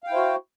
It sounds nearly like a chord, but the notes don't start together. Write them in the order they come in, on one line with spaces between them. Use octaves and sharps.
F5 G5 E4 C5 F#4